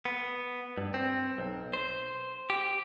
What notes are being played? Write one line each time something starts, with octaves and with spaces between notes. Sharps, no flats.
B3
G2
C4
B1
C5
G4